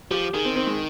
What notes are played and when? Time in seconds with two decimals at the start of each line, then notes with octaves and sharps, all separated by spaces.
0.11 F3 G4
0.33 D#3 G#4
0.45 C4
0.56 C4
0.67 G#3